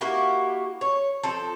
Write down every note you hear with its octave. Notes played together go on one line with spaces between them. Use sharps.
A#3 E4 F#4 G4
C#5
F3 C4 A4